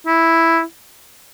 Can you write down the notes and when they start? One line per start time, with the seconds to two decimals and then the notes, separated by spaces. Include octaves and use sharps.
0.07 E4